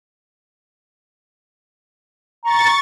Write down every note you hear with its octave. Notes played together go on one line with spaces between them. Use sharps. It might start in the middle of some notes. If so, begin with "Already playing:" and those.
A#5 C#6 A6